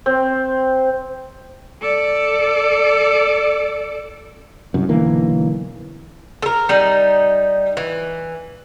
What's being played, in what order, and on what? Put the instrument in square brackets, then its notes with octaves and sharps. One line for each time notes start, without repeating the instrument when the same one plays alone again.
[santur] C4
[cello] A4 D5
[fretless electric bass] C2 F#2
B1 D3 E3 A#3
[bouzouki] A4 A#4
G3 D#4
E3